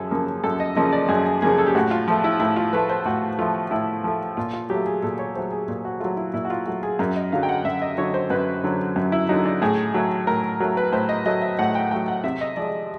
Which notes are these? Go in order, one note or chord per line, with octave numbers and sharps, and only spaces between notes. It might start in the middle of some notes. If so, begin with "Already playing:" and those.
Already playing: F#2 C#3 F3 G#4 A4
C#3 F3 A#3
F#2 A4
D#5
C#3 F3 A#3 D#5
D5
F#2 G#4
G#4
C#3 F3 A#3 G#4
A4
G4
A2 F#4
F4
F3 A3
E4
A2 E4
F4
F3 A3 B4
C5
A2 F#4
F3 A3 F4
A2 E4
F3 A3
A#2 F4
F4
F#3 A3 G4
G#4
A#2 A4
C#5
F#3 A3 C5
G#4
A#2
F#4
F#3 A3 F4
E4
A#2 E4
F#4
F4
F#3 A3 F#4
G#4
F#2 A#4
D#5
D3 F#3 F5
G5
F#5
F#2 E5
D#5
D3 F#3 C#5
C5
F#2 B4
D3 F#3
F#2
E4
D3 F#3 D#4
D4
A2 G#4
F#3 A3
A2 A#4
F#3 A3 A#4
B4
A2 C5
D#5
F#3 A3 D#5
E5
A2 F#5
G5
F#3 A3 G5
F#5
C3 E5
D#5
F3 G#3 D5